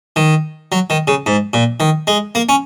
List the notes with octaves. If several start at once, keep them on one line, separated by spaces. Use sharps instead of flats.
D#3
F#3
D#3
C#3
G#2
A#2
D#3
G#3
A#3
C#4